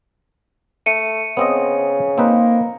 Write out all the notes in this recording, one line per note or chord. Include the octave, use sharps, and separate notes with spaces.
A3 C#7 D#7
C#3 B3 C4 D#5
A#3 C4 D#4 B4